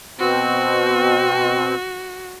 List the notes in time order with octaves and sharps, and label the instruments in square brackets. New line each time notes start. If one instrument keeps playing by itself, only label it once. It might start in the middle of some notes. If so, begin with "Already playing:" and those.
[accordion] B2 C4 [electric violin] F#4